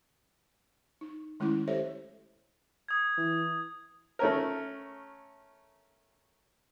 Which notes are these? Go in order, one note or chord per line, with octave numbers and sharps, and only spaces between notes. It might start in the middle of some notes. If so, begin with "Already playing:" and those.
D#4
D#3 G#3 A3 C#4 E4
G4 A4 C5 C#5 D#5 E5
D#6 G#6
E3
A3 C#4 A#4